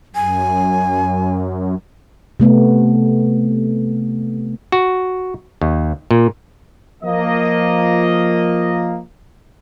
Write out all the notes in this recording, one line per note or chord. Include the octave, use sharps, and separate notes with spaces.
F#2 G#5
C3 A3 B3
F#4
D#2
A#2
F3 A#3 D#5